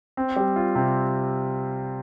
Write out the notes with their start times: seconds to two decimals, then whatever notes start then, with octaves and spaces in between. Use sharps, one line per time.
0.17 C4
0.36 G3
0.56 F4
0.75 C3